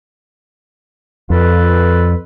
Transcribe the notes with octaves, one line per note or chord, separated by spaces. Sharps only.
F2 F4 A4 B4